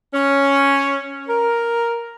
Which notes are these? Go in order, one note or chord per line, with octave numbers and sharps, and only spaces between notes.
C#4
A#4